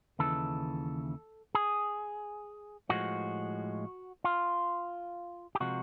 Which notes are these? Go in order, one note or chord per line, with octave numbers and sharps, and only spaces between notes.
D#2 C#3 E3 A4
G#4
A2 F3 G#3 F#4
F4
G4
C3 F3 G#3 F#4